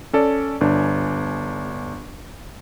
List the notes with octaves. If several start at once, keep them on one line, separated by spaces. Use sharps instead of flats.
C#4 A4 D5
G1 D4